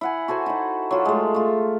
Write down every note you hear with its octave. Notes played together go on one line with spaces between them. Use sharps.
E4 F#5 G#5
F#4 A4 C5 G#5
D#4 E4
F#3 F4
G#3 A3
A3 F4